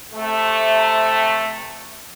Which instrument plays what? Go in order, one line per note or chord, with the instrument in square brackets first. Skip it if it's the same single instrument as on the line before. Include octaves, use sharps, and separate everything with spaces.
[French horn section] C3 A3